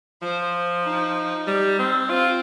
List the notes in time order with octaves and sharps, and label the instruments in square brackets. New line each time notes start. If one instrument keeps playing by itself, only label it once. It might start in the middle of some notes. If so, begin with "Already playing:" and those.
[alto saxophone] F3 [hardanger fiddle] C5
[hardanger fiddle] D#4
[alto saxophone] G3
C4
[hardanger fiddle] C4 [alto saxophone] F4